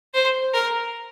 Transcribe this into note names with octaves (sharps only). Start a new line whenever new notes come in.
C5
A#4